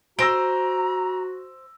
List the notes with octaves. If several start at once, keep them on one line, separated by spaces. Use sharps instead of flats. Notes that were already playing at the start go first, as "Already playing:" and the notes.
F#4 C5 A#5 E6 A#6 D7